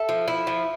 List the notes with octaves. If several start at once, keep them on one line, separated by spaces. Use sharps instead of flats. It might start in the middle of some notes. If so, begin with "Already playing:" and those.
Already playing: A4 E5
F3
E4
F3